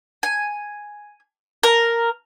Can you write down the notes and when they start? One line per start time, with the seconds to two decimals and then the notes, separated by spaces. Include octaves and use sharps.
0.23 G#5
1.63 A#4